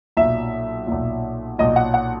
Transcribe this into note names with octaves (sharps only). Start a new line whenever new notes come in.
B1 A#2 E5
B1 A#2
B1 A#2 D#5
F#5
F#5